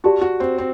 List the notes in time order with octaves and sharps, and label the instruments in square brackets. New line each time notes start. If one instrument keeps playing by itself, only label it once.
[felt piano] F#4 [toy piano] G4 D5 A5 C6
[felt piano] F#4
C4
C4